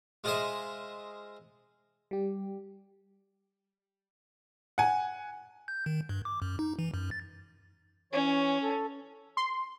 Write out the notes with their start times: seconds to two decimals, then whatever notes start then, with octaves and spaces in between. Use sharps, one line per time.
0.24 G#3 F4 G#4 C5 D#5 E5
2.11 G3 G4
4.78 F#5 G#5
5.68 G6
5.86 D#3
6.09 G2
6.25 D6
6.42 F#2
6.59 D#4
6.79 E3
6.94 F#2
7.11 A6
8.13 E3 C#4 C#5
8.63 A4
9.37 C6